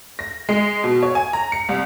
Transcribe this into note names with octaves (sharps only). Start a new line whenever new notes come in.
A#6
G#3
B2
C#5
G#5
A#5
C#7
C2